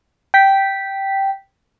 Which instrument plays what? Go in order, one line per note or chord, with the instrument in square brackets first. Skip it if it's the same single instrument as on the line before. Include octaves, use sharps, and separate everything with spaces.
[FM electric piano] G5 B6